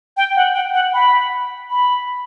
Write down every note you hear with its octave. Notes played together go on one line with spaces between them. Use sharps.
G5
F#5
G5
F#5
B5
B5